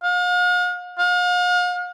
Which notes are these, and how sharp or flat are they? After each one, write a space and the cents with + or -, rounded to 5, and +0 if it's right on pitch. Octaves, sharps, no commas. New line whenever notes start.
F5 +45
F5 +40